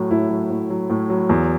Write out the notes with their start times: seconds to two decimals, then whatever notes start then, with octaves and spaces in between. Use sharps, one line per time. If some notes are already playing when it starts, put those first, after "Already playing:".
Already playing: A2 F#3
0.11 A2 E4
0.30 F#3
0.50 A2
0.70 F#3
0.90 A2
1.10 F#3
1.29 E2